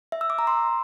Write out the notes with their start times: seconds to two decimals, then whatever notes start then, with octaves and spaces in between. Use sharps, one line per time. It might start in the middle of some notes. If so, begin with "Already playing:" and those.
0.12 E5
0.21 E6
0.30 D6
0.39 A#5
0.47 C6